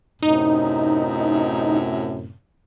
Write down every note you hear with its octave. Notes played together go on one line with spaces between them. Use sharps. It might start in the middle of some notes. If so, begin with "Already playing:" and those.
F#2 A2 C3 D#4